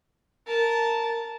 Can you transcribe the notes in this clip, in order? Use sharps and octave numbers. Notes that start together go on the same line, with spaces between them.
A#4 A5